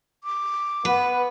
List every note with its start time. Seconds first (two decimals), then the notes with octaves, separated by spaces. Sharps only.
0.24 D6
0.85 B3 B4